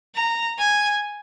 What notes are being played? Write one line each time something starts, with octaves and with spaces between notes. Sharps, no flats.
A#5
G#5